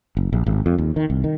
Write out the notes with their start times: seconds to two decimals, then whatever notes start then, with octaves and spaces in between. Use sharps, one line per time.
0.17 F#1
0.33 A#1
0.46 G#1
0.66 F2
0.78 D#2
0.96 D#3
1.10 C2
1.24 D#3